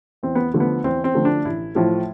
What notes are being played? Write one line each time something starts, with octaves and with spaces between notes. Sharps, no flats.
E2 C4
B3
D3 F3 A3
B3
E2 C4
C4
D3 F3 A3
D4
A1 E4
A2 F3 A3